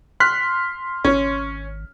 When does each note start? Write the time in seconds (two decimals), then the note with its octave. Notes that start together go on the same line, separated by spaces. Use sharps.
0.20 C6 F6 F#6 B6
1.04 G#1 C#4